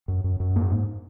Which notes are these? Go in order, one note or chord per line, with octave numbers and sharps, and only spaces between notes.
F#2
F#2
F#2
G#2 A#3
G#2